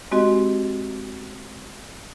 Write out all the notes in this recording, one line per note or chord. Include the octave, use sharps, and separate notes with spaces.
G#3 C4 F#4 G4 D#5